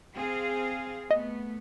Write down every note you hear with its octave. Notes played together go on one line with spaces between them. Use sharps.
C4 G#4 F5
A3 B3 D#5